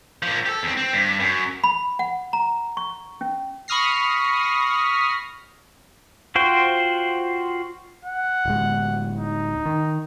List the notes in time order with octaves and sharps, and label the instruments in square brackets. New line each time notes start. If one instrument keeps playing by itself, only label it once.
[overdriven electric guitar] A#2 F3
G4 A4
E2 C4
C4
G2
F#2
[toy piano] B5
F#5
A#5
C#6
C#4
[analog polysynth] B5 C#6 D#6 F6 A#6 C7
[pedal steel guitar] F4 F#4 C5 G5
[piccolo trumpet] F#5
[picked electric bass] D1 G#3
[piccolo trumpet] D#4
[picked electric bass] D#3